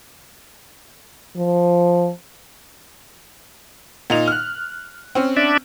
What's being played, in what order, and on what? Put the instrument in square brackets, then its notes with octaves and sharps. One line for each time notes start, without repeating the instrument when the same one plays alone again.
[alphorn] F3
[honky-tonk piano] A#2 D#4 F7
F6 F#6
C4 C#4
[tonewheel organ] D4 D5 E5